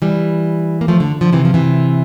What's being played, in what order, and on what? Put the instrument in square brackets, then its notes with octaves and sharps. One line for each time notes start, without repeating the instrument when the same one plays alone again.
[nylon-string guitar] E3 G3
A#3
F3 A3
D3
D3 F3
C3 E3
F3
C3 E3